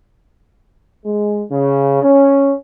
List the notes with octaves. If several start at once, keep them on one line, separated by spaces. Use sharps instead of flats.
G#3
C#3
C#4